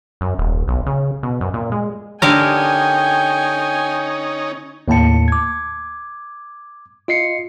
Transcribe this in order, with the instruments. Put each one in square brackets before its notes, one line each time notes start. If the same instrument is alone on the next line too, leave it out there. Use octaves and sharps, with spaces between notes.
[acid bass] F#2
D#1
B1
C#3
B2
F#2
A#2
G#3
[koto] D3 G4 A#4 [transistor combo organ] C#4 D#4 [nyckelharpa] G5 G#5
[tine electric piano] D#2 A2 A#3 A5 C#7
D6 G#6
F4 D#5 C7 C#7